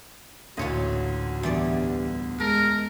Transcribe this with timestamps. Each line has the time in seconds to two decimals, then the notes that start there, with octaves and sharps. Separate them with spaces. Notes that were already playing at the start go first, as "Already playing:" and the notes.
0.57 A1 D2 A#2 F4 F#4 C#5 D#5
1.43 E2 G2 B3 D5
2.40 G#3 A4 A#4